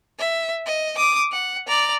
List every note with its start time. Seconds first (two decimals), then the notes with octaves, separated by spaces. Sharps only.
0.19 E5
0.66 D#5
0.97 D6 D#6
1.32 F#5
1.67 D5 A#5